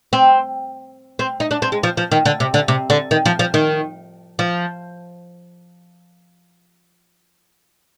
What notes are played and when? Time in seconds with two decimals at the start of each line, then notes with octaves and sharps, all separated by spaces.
0.13 C4
1.19 C4
1.40 D#4
1.51 D4
1.62 C4
1.72 G#3
1.83 F3
1.97 F3
2.12 D#3
2.25 D3
2.40 C3
2.54 D3
2.68 C3
2.90 D3
3.11 D#3
3.26 F3
3.39 F3
3.54 D#3
4.39 F3